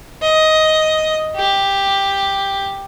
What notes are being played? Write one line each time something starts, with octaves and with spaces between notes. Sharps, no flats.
D#5
G4